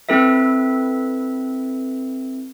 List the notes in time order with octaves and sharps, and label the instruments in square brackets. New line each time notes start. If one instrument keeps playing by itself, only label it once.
[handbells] C4 E4 A4 B4 E5